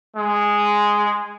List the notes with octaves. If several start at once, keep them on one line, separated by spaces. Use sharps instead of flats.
G#3